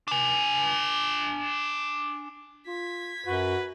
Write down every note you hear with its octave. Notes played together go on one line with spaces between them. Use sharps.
D4 G#5
F4 G#6 B6
F#2 F#4 B4